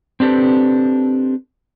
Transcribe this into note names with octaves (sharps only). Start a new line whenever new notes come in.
C4 D4 G4 A4 B4